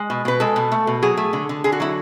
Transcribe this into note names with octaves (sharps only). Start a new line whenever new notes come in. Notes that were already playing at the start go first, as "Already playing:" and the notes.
Already playing: G#3
B2
B2 B4
G#3 A4
B2
A3
B2
F#3 G#4
A3
D3
D3
D3 G#4
F#4
F#3 E4